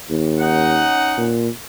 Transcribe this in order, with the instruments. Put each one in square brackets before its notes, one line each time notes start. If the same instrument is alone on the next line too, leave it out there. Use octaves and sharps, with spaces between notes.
[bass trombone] D#2
[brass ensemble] C#4 D#4 F#5
[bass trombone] A#2